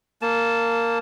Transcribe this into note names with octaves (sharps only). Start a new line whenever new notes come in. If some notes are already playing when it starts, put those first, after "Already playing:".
A#3 A5